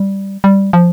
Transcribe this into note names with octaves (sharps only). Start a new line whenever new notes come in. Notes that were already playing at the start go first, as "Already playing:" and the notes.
Already playing: G3
G3
F3